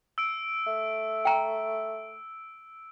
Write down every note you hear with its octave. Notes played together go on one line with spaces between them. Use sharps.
E6 D7
A3
G5 A#5